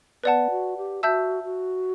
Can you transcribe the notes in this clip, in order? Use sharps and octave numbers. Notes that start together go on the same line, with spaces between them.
B3 B4 D5 F#5 A5
F#4
G4
F#4 E5 A5 E6 G6
F#4